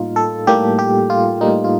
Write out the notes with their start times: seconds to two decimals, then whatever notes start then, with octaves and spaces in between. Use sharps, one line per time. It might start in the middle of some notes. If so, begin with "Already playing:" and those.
Already playing: A2 G3 A#3 D#4 F4
0.16 A4
0.47 A2 G3 A#3 G4
0.79 G4
1.10 F4
1.41 A2 G3 A#3 D#4
1.64 F4